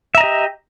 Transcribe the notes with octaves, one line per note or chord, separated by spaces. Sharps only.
G4 D#5 E5 A#5